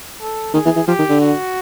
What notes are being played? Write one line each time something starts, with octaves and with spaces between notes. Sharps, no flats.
A4
D#3 G#4
E3
E3
F3 G4
D#3
D3
F#4